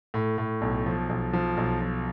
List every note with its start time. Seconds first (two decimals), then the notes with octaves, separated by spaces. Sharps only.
0.14 A2
0.38 A2
0.61 B1
0.86 F3
1.09 B1
1.33 F3
1.57 B1
1.81 F3